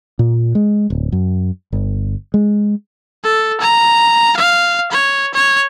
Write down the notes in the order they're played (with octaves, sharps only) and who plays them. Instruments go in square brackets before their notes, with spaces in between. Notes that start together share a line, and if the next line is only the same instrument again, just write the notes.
[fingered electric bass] A#2
G#3
D1
F#2
G1
G#3
[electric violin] A4
A#5
F5
C#5
C#5